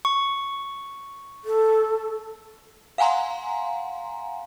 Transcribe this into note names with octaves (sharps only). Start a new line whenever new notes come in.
C#6
A4
F5 F#5 G#5 A#5 C6